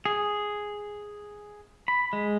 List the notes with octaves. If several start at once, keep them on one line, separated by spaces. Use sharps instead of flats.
G#4
B5
G#3